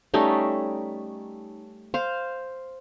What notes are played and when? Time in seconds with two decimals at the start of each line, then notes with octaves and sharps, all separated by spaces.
0.14 G3 A3 C#4 D#4
1.94 C5 F5